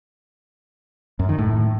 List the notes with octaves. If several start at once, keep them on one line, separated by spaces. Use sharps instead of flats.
F#2
D#3
A2